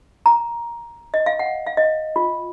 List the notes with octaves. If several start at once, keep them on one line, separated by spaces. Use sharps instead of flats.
A#5
D#5
F5
F#5
F5
D#5
F4